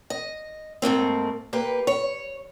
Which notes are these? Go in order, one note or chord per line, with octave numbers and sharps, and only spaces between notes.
D#5
G#2 A3 A#3 C4
A#3 G4 B4
C#5